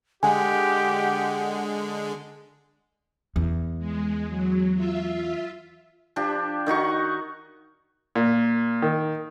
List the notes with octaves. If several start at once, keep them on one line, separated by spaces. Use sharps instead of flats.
D3 G#3 G4 F#5 G#5
E2
G#3
F#3
F4 E5
F3 D4 G4
D#3 D#4 F#4 C#6
A#2
D#3